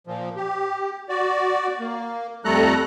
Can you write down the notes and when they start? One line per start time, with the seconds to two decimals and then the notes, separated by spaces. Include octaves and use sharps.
0.07 A#2 F3
0.36 G4
1.09 F#4 D5
1.80 A#3
2.45 F2 G3 A3 A4 A#5 F#6